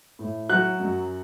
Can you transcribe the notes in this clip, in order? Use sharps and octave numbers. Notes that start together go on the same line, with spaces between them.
A2
F#3 F#5 F#6
F#2